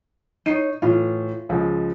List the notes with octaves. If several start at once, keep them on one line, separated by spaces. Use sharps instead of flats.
D#4 C#5 C7 D#7
A2 E3 F4
C#2 F3 G#3